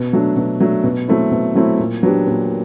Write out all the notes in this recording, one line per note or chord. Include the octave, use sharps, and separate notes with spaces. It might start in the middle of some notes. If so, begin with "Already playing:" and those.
Already playing: B2
F#3 A3 D4
B2
F#3 A3 D4
B2
F#3 A3 C4 E4
B2
F#3 A3 C4 E4
A#2
F#3 B3 D4 G4
A#2